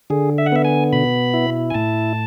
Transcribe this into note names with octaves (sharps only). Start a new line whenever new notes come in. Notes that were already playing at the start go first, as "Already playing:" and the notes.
D3 G#4
E5
F#5
B3 E5
G#5
B2 B5
E4
G#5
A2 A5